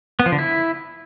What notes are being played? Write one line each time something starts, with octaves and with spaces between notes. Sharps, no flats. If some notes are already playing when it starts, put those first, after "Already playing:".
B3
F3
D3
E4